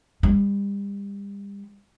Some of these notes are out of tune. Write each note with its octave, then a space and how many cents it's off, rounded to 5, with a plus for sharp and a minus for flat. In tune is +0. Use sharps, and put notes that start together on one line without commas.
G3 +35